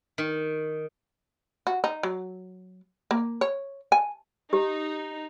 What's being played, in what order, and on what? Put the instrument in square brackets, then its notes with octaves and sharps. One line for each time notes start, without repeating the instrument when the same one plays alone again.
[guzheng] D#3
[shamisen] F#4
D#4
F#3
A#3
C#5
G#5
[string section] D#4 [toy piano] G4